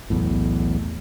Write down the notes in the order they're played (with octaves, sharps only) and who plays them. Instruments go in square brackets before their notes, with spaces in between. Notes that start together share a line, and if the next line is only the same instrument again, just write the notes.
[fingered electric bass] B1 E2 A2